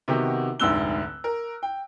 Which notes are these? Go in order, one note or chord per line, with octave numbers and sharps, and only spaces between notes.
C3 D#3 B3 F#4 G4
F1 D2 G#2 E6 F#6 G7
A#4
G5